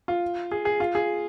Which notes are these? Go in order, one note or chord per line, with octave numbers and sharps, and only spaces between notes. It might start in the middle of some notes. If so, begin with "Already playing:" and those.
F4
G#4
G#4
F4
G#4